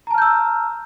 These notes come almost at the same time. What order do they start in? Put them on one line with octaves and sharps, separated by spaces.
A#5 A5 F6 G6 E6